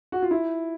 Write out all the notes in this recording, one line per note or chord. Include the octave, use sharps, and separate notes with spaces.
F#4
F4
E4